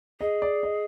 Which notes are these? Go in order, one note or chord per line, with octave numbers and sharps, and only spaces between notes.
G#4 D#5
D5
D#5